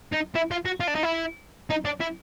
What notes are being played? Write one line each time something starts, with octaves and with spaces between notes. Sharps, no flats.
D#4
E4
F4
F#4
F4
D4
D#4
E4
D#4
D4
E4